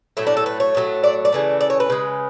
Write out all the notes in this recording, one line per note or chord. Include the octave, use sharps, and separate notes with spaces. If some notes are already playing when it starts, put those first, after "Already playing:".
A2 F#3 A3 E4
D4
A4
B4
C#5
A2 F#3 A3
D5
D5
C#3 E3 A3
D5
C#5
B4
C#3 G#3